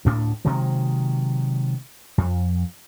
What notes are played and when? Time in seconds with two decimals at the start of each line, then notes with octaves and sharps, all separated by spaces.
0.05 D2 A2 D4
0.45 C3 D#3 F#3 G#3
2.18 F2